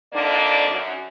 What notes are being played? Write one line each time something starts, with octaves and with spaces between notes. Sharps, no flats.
F2 D3 A#3 D4 D#4 D5
F#2